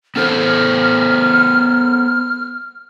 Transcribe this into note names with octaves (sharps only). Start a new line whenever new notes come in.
B3 A4 C5 F6